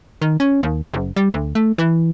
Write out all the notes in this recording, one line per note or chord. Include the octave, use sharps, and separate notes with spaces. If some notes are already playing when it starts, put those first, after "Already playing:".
D#3
C#4
D#2
F#1
G3
D2
A3
E3